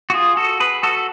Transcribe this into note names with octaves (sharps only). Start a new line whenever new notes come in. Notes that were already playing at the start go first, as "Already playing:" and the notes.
F#4
F4 G#4
F#4 A4
G#4 B4
F#4 A4